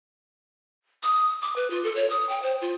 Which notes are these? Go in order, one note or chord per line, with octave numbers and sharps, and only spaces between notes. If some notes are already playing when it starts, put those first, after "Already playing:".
D#6
D6
B4
F4
A4
C#5
D#6
G5
C5
F4